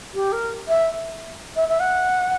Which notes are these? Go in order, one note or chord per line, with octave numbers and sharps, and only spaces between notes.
G4
A#4
E5
E5
E5
F#5